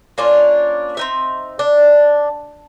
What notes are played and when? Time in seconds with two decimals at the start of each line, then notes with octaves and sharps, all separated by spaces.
0.18 A#3 C#4 D4 F4
0.97 C4 D#4 E5
1.59 D4